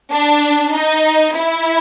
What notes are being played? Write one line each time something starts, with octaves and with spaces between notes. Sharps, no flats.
D4
D#4
E4